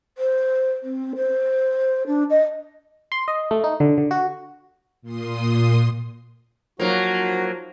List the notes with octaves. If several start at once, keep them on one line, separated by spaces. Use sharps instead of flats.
C5
C4
C5
D4
D#5
C6
D#5
A3
D#4
D3
D3
F#4
A#2 C6 D#6
F3 F#3 A#3 D#4 F#4